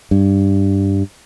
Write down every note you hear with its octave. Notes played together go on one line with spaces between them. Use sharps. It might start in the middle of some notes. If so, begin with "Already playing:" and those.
G2